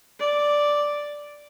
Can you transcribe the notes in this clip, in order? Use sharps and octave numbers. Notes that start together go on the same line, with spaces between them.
D5